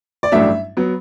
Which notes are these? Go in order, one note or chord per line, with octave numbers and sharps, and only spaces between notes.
D5
A1 G2 F#3 A3 D4 E5
F#3 B3